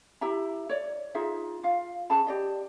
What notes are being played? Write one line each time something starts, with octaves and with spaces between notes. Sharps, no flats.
E4 G4 E5 A#5
C#5 D5
D#4 F4 G#4 E5
F4 F5
C#4 G#4 A5 B5
G4 D5 D#5